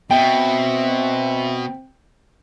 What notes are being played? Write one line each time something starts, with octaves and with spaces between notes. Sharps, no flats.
B2 C4 E5 G5